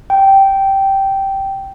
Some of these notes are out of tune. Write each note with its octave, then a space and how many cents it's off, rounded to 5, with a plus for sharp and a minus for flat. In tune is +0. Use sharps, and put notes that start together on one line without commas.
G5 -10